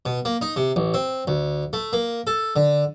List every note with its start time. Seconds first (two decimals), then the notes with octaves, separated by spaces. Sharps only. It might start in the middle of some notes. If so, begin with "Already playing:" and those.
0.06 B2
0.25 A#3
0.42 D#4
0.56 C3
0.76 A1
0.94 C4
1.28 D2
1.73 A3
1.93 A#3
2.27 A4
2.56 D3